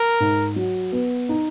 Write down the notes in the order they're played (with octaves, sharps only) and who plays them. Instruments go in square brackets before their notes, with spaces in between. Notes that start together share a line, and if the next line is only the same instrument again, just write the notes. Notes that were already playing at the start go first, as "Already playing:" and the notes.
Already playing: [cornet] A#4
[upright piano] G#2
F#3
B3
D#4